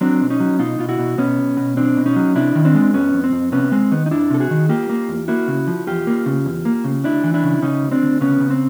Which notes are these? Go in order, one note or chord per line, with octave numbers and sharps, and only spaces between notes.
F#3 C4 D4
B1
C#4 D#4
F#3
B2 D#4 F4
B2 F4
E4 F#4
B2
B2 B3 C#4
B1
B2
B1 C4 D4
B2
C#4 D#4
F#3
C3 D4 E4
D#3
C4 D4
G#3
F2 B3 C#4
F2
C4
F2
C3 B3 C#4
G#3 C4
D#3 B3
D#4
F2 D4 E4
C3 A4
F#4 G#4
D#3
A#3 F4 G4
A#3
E2
A#3 E4 F#4
C#3
F3
E2 F4 G4
A#3
C#3
E2
A#3
C#3
D2 D4 E4
E3
D4 E4
C#3
C#3 C#4 D#4
D2
C4 D4
D2
C#3 B3 C#4
C#3
C4